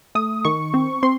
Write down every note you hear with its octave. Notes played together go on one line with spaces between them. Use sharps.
A3 D#6
D#3 C#6
C4
C4 C6